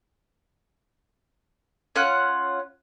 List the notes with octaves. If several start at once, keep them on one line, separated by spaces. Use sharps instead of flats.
C#4 F4 F#5 F#6